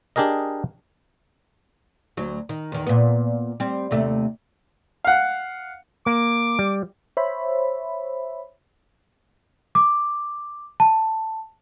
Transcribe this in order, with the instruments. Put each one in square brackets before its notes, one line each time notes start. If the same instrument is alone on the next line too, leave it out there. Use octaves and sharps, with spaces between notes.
[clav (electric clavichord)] D4 G4 G#4 A#4 D#5
[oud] D2 F#3
D#3
E2 D#3
A#2 B3
G3 C4
D#2 C3 A3
[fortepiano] F5 F#5
[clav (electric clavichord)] A#3 [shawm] D6
[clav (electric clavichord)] G3
[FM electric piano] C5 C#5 E5 B5
[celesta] D6
A5